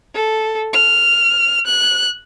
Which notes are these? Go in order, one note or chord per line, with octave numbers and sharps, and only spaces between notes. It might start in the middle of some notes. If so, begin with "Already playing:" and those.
A4
F6
F#6